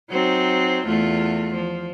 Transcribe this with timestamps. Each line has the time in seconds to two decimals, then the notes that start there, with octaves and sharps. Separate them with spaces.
0.10 F#3 C4 D#4
0.86 E2 A3 F4
1.54 F3